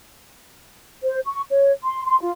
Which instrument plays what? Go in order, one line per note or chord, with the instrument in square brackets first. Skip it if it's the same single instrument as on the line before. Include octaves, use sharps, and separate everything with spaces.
[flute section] C5
C#6
C#5
C6
C6
F4